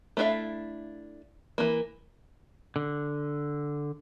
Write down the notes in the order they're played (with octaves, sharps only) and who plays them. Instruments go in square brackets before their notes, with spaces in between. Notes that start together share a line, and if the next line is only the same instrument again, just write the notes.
[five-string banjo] A3 D4 E4 E5 F5
E3 A#3
[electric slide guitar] D3